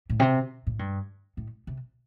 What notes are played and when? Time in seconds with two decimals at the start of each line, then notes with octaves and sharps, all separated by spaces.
0.09 A2
0.19 C3
0.67 A2
0.79 G2
1.37 A2
1.67 C3